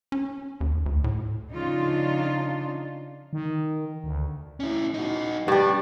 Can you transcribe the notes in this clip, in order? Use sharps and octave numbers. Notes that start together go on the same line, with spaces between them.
C#4
D#2
D2
A2
C#3 F3 D4 D#4 F4
D#3
D2
C#4 E4
D#4 F#4
G2 G3 D4